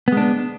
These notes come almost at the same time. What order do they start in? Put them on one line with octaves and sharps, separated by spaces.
B3 G#3 D4